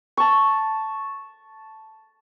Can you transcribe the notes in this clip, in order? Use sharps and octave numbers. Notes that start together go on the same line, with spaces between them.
A5 C#6